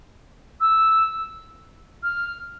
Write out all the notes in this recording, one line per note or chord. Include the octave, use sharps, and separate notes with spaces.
E6
F6